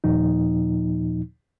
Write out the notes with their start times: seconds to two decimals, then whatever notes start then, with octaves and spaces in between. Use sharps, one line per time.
0.04 D#2 A#2 F3 D#4